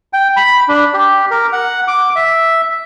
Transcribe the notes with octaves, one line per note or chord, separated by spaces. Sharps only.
G5
B5
D4
G4
A#4
F#5
D6
E5